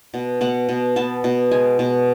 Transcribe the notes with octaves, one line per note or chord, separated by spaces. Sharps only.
B2
B2 F#5
B2
B3 A5
B2
G#3 G#5
B2